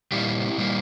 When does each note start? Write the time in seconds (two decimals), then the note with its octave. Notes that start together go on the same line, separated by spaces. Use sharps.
0.12 A#2 G3 A#3 E4 G4
0.57 A#2 G3 A#3